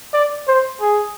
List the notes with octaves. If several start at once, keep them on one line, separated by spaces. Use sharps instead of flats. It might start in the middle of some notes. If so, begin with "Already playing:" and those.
D5
C5
G#4